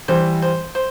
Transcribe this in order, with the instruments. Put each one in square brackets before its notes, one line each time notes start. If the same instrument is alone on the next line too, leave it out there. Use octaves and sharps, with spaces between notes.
[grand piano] E3 G3 [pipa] C5
[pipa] C5
C5